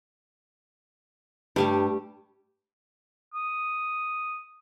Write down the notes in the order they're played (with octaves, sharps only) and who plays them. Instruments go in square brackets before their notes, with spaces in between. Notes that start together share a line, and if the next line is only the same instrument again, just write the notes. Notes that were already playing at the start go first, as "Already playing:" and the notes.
[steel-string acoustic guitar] G2 [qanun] G3 A3 G4
[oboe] D#6